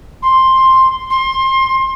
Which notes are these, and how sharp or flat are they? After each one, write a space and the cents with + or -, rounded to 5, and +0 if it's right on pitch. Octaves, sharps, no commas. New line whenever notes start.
C6 +5
C6 +25